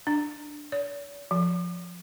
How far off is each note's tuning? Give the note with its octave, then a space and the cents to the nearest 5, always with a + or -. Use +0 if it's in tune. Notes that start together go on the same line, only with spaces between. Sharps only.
D4 +5
C#5 +45
F3 +10